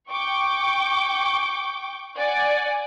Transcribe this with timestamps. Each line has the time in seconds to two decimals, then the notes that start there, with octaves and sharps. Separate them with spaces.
0.10 G5 C#6 D6
2.18 D5 F#5 G#5